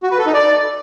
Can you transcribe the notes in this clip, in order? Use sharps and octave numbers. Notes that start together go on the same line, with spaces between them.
F#4
B4
A4
D#4
D5